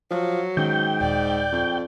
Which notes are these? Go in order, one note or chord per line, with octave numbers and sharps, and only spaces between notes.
F3 F#3
G#2 D#3 C#4 G5
D#1 D5
F2